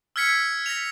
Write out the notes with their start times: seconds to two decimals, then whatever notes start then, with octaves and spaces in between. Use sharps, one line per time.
0.16 E6 F6 G#6 B6 C#7
0.66 A#6 B6 F7